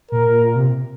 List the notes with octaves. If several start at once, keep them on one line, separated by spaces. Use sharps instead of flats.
A#2 A#4
C3